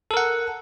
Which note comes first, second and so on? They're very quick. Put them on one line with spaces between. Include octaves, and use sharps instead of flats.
A4 A#4 F#5